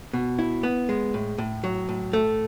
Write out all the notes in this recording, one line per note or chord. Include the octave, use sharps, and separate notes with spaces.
B2
E4
B3
G#3
A2
A2
F#3
A2
A3